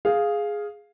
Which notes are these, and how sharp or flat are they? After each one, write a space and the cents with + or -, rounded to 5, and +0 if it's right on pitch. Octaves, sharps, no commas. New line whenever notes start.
G#4 +0 F5 +0